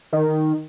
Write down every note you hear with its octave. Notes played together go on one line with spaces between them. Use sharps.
D#3